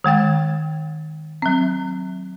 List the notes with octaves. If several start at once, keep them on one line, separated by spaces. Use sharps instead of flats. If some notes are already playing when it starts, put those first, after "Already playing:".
D#3 G#3 G5 A6
F#3 C4